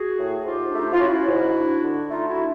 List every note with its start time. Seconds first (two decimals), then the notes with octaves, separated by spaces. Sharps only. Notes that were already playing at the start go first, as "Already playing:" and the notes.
Already playing: F#4 G#4
0.18 A2
0.45 G#2 F4 G4
0.71 A3 D4
0.78 D#4
0.86 E4
0.93 F4
1.00 C#4 E4 F#4
1.27 G#2
1.55 D4
1.83 D3
2.10 A3 D#4 F4
2.28 E4 F#4
2.37 D4